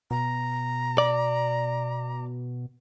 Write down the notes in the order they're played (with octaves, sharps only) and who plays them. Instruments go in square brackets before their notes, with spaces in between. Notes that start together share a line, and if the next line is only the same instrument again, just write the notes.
[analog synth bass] B2 [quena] A#5
[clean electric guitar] D5